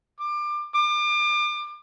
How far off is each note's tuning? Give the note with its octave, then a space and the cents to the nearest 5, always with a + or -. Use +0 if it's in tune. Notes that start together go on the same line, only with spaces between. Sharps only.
D6 +25
D6 +35